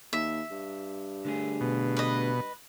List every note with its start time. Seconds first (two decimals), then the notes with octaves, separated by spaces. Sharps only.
0.13 D#2 E5
0.51 G2
1.25 D3 A3 G#4
1.61 B2
1.97 B4 D#5